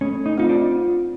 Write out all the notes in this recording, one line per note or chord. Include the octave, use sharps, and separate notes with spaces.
A3 C#4
D#4
C4 D#4 F4
D4